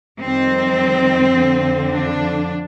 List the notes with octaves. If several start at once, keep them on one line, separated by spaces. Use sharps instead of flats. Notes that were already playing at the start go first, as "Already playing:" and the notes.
F2 D#3 G3 C4
F2 D3 F3
D4